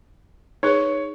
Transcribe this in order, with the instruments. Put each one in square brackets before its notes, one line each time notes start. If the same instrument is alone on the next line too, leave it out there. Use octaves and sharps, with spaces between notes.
[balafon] D#4 G#4 B4 [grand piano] C#5